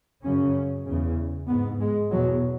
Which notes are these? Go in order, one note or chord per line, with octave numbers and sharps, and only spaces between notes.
F#2 C#3 C#4
E2 C#3
G#2 B3
G#3
E2 B2 F#3